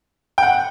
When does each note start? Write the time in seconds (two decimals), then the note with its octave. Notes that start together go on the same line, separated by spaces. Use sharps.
0.38 G5
0.43 F#5